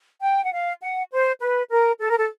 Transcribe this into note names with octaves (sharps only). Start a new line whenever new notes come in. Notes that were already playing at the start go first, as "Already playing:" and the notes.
G5
F#5
F5
F#5
C5
B4
A#4
A4
A#4
A4